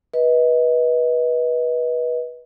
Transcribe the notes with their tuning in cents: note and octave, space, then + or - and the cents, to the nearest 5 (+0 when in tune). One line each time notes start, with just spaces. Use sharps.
B4 -20 D#5 +25